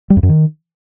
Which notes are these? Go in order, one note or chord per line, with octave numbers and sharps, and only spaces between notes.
G3
F2
F#2
D#3